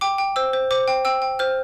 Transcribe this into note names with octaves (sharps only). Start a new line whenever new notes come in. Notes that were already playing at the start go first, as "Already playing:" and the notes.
G5 D6
G5
C5 E6
C5
C5 D6
G5
G5 E6
G5
C5 F6